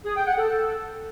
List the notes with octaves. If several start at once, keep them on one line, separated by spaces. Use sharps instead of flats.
G#4
G5
F#5
A4